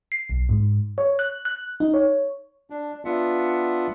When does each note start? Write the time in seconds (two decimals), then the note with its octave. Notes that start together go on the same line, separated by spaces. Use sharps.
0.12 C7
0.30 B1
0.49 G#2
0.98 C#5
1.19 F#6
1.45 F#6
1.80 D#4
1.94 C#5
2.70 D4
3.05 B3 D4 F4 E5 F#5